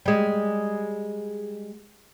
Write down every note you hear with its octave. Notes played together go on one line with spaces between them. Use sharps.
G3 G#3